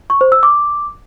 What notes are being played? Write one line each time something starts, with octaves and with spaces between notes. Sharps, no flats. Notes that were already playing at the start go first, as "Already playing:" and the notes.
C#6
C5
E6
D6